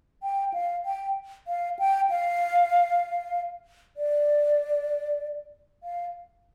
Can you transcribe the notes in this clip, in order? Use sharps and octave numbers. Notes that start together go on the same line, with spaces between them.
G5
F5
G5
F5
G5
F5
D5
F5